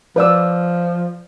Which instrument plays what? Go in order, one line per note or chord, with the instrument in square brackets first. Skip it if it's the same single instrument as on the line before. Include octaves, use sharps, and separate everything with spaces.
[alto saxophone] F3 [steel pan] B4 D5 E6